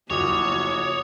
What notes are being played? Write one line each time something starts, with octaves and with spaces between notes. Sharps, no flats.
F#1 F3 F#4 C#5 D6 D#6 F7